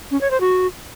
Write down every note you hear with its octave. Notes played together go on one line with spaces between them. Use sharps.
C#4
C#5
C5
F#4